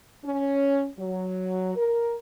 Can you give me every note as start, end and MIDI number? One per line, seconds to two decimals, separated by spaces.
0.24 0.87 61
0.98 1.74 54
1.75 2.16 70